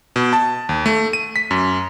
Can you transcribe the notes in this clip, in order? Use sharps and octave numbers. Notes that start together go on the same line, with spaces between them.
B2
A5
D#2
A3
D#7
B6
F#2